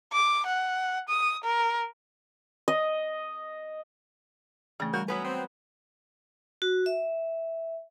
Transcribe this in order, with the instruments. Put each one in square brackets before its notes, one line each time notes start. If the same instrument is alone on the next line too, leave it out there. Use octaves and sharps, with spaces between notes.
[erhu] D6
F#5
D#6
A#4
[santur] D#5
[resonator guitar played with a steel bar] C#3 [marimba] E3 A3
[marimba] G3 [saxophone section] F#4 A#4
[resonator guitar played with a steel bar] F#3 B3 B4 [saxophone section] C#4
[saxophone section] C4
[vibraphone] F#4
E5